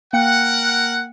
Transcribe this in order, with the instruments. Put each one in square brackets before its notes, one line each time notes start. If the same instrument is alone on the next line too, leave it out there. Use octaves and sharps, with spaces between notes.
[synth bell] A#3 G5 C#7 [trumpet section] A#4 F#5